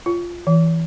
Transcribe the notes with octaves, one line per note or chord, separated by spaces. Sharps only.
F4
E3